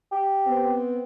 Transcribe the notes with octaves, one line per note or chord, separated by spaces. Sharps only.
G4
B3 C4